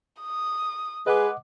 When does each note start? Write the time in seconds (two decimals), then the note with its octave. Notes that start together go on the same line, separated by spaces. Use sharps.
0.21 D#6
1.07 G#3 G#4 B4 D#5 F#5 D6